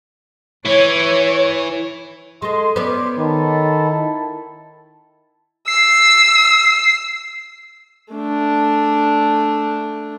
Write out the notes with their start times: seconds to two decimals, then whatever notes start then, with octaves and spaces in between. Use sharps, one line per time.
0.66 E3 C#5
2.42 G#3 A4 D#5 C6
2.76 B3 C#4 C5 D5 D6
3.19 D#3 A4 A5 B5
3.90 E4 A5
5.68 E6 C7
8.13 A3 D4